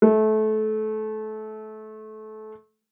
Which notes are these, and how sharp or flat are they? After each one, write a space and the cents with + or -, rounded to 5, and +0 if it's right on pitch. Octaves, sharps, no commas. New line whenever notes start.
A3 -25